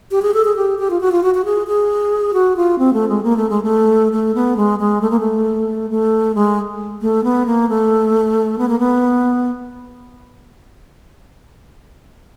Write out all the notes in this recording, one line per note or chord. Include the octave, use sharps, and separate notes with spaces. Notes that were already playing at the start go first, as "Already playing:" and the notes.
G4
G#4
A4
G#4
G4
G4
F4
F#4
F4
F#4
F#4
G#4
G#4
F#4
F4
C4
A3
G#3
A#3
A3
G#3
A3
A3
B3
G#3
G#3
A3
A#3
A3
A3
G#3
A3
B3
A#3
A3
B3
A#3
B3